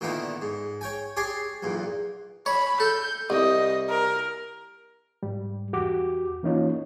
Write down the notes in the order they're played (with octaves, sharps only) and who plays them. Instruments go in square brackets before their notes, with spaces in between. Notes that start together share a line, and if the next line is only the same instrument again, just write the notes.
[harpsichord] A#2 D3 D#3 B3 D#4 E4
G#2
C#5 G5 G#5
G4 G#4 C#5 D5 G#5 C6
B1 E2 A#2
[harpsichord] C#5 [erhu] B5
[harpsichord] A4 [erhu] G6
[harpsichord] C2 [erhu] D#5
[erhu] A#4
[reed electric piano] G#2 G3
E2 F#4 G4 D6
E3 A#3 C#4 D#4 F4 C#5